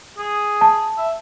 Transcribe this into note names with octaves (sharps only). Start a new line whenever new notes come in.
G#4
A5
E5